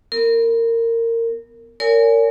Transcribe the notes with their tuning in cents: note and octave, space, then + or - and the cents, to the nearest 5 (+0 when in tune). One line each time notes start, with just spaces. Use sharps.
B3 -5 A#4 -25
A#4 -25 C#5 +45 G#5 +0